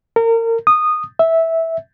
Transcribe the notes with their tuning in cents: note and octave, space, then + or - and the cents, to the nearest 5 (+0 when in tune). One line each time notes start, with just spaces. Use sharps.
A#4 -30
D#6 -15
E5 -10